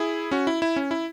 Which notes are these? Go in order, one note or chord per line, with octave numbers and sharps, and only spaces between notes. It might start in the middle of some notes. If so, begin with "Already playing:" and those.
Already playing: E4 G#4
C#4 F#4
E4
E4
C#4
E4